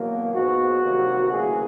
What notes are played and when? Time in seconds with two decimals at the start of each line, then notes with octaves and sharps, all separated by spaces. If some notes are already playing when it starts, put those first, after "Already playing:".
Already playing: E2 B2 F#3 A#3
0.33 G#2 F3 G#3 B3 F#4
0.82 C2 C3 D#3 F#3 A#3
1.30 D2 C#3 E3 G3 A#3 G#4